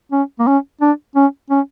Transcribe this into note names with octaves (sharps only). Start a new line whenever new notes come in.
C#4
A#3
C#4
D4
C#4
C#4